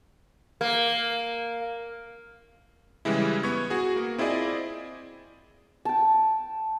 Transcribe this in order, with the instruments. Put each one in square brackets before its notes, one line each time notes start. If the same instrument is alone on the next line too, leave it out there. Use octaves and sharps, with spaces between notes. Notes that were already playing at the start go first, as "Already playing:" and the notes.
[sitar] A#3
[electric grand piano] C#3 E3 G3 G#3 E4
B3 C#6 G#6
F#4 G#4
A#3
C4 E4 F4 G#4 D5 D#5
[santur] G5 A5